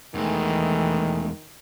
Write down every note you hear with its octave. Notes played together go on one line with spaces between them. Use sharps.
E2 D#3 E3 G#3 A3